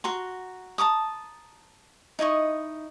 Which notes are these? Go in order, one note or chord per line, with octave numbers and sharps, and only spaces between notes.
F#4 A#5 C6
A5 A#5 D6 D#6
D#4 E4 D#5 C#6